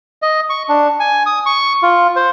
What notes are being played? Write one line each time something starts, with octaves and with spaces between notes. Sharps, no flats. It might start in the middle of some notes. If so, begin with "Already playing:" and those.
D#5
C#6
D4
G#5
D#6
C#6
F4
C5